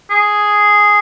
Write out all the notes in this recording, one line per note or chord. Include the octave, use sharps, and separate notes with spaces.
G#4